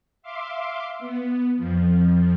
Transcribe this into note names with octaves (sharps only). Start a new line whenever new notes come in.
E5 F5 C6 D6
B3
F2 F3